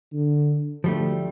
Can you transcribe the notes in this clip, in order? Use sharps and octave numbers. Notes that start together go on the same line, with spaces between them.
D3
D2 F3 G3 A3